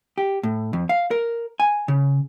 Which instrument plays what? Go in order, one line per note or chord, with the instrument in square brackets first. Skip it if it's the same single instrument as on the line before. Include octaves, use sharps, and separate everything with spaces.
[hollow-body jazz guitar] G4
A2
F2
F5
A#4
G#5
C#3